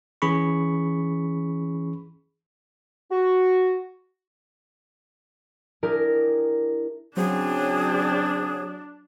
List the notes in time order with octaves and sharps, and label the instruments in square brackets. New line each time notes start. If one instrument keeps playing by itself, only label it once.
[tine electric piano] E3 C#4 G#4 B5 C#6
[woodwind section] F#4
[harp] D4 E4 G4 G#4 A#4
[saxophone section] C#3 C4 [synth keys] F#3 [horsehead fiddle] D4 [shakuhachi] G#4